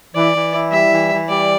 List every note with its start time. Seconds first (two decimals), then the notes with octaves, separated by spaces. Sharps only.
0.15 E3 D5
0.33 E3
0.54 E4
0.72 G3 E5
0.91 E3
1.11 E3
1.29 G3 D5